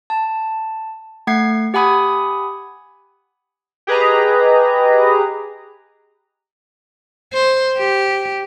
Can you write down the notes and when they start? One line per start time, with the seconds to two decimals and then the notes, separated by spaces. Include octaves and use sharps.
0.10 A5
1.27 A3 F#5 G#6 C7
1.74 G4 F#5 G#5 B5 D#6 G#6
3.87 G4 G#4 B4 D#5 A#5
7.33 C5
7.78 G4